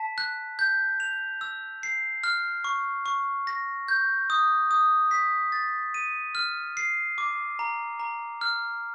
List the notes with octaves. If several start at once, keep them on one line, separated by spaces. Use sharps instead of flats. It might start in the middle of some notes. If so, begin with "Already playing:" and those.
Already playing: A5 B6
F#6
G6
F7
E6
C7
F6
C#6
C#6
A#6
G6
D#6
D#6
B6
A6
D#7
F6
C7
D6
A#5
A#5
F6